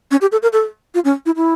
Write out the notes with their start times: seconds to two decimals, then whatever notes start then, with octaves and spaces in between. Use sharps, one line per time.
0.11 C#4
0.21 G4
0.32 A4
0.42 A#4
0.53 A4
0.95 F4
1.05 C#4
1.26 E4
1.36 E4